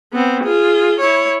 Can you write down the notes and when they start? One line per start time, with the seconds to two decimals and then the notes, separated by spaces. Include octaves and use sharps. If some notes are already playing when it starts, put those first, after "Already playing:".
0.13 B3 C4
0.43 F4 G#4
1.00 E4 C#5